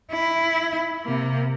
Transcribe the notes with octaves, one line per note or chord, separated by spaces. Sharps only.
E4
C3 A#3